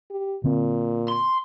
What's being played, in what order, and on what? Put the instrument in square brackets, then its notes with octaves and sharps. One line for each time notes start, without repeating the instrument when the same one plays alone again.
[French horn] G4
[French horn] A#2 [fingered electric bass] D3 C4
[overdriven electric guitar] C6